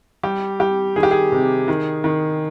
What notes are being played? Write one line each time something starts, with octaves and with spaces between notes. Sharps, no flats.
G3 G4
G3 G4
D#3 G#4
G4
G#4
C3
D#3
D#3